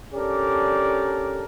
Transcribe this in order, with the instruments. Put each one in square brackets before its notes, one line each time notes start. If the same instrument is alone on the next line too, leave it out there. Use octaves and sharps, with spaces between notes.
[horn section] C#4 D4 G4 A4 A#4 D5